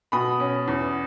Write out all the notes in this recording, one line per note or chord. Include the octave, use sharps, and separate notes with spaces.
B2 B5 D#6
C#4
E2